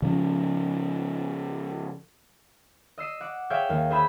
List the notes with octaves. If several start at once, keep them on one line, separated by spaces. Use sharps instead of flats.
C#3 F3 C#4
D#5 E6 C7 D#7
F#5 D6
G#4 C#5 E5 F5 G5
D#2 A#3
G#4 C5 E5 B5 E6 G6